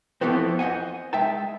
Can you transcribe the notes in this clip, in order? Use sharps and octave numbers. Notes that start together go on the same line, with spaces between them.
F2 E3 F3 A3 B3 C4
C5 D#5 F5 F#5 G#5
G#3 E5 G5 A5